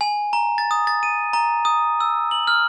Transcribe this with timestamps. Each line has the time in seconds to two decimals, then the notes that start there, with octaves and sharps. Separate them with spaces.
0.01 G#5
0.33 A#5
0.58 A6
0.71 D#6
0.87 A6
1.03 D#7
1.33 A#5
1.65 D#6
2.00 E6
2.31 F#7
2.47 F6